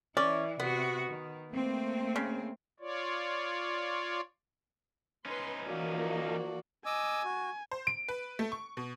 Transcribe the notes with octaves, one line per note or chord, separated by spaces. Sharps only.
E3 C#4 E4 D5
C3 B3 F#4
D#3
A3 A#3 C4
C#3
F4 C#5 D5
C#4 D#4 B4 C6
E3 F3 A#3 F#4 D5
D#5 G#5 D6 E6
F#4
C5
D7
B4
A3
C#6
B2